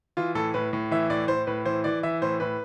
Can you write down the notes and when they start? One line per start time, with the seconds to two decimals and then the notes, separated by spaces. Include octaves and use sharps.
0.17 E3 F4
0.35 A2 A4
0.54 A2 B4
0.73 A2
0.91 E3 E5
1.10 A2 D5
1.28 A2 C5
1.47 A2 B4
1.65 E3 C5
1.84 E3 D5
2.03 E3 E5
2.22 A2 C5
2.40 A2 B4